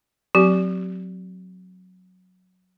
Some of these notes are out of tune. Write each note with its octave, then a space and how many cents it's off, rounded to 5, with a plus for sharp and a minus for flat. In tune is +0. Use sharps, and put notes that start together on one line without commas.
F#3 -10 C4 +0 G4 -30